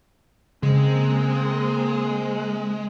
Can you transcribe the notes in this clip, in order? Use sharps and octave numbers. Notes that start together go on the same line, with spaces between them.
C#3 G#3 A#3 C4